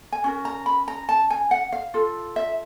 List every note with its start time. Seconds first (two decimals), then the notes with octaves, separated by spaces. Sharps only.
0.12 G#5
0.24 C#4 F#4 A#4
0.45 A#5
0.66 B5
0.88 A#5
1.09 A5
1.30 G#5
1.51 F#5
1.72 F5
1.94 F4 A4
2.36 E5